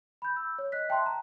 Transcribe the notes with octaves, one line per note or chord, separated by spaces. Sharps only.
B5 G6
E6
C#5
D#5 F#6 B6
E5 G5 A5 C6 F#6
A5 A#5